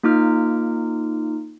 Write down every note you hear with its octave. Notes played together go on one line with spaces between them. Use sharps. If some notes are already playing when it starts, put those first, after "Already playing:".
A#3 D#4 F4 D6 F6